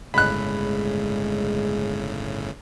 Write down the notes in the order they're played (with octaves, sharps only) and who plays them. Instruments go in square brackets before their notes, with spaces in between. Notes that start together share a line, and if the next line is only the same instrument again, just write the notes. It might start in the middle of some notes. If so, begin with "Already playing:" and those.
[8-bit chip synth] G1 A2 C#3 [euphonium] G#3 [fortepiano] B5 F#6